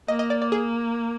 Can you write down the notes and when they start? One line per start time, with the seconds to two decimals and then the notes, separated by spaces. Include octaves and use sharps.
0.08 A#3 D#5
0.19 D#5
0.30 D5
0.42 D5
0.52 G#4